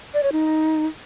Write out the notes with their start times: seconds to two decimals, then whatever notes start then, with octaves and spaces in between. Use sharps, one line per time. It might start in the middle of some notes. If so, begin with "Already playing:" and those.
0.14 D5
0.23 C#5
0.32 D#4